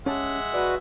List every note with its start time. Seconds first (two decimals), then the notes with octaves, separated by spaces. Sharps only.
0.06 G#3 C#4 G4 E5 F#5 A5
0.54 F#4 B4 D5